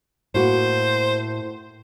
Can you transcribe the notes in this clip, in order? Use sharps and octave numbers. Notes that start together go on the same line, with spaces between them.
A2 A#3 F#4 C5